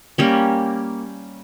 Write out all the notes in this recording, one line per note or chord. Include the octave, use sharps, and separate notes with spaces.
G3 A#3 C#4